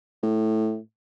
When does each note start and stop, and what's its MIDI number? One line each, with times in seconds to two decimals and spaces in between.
0.23 0.78 45